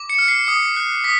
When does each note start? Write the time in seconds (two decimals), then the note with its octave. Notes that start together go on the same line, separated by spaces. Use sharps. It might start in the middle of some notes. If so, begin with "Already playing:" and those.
Already playing: D6
0.10 C#7
0.19 F6
0.28 C7
0.47 D#6 C#7
0.76 F#6
1.04 D#6 B6